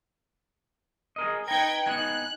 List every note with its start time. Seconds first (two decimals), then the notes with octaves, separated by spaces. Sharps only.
1.16 G#4 A#4 D#5
1.48 D#4 B4 G5 A#5 G#6
1.86 B3 D#4 G#5 F#6